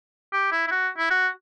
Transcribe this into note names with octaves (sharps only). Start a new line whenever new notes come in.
G4
E4
E4
F#4
E4
F#4